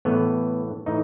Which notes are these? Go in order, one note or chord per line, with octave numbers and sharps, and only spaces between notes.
A2 E3 B3
A2 E3 D#4